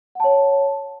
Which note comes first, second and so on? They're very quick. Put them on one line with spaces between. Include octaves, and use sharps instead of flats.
F#5 A5 C#5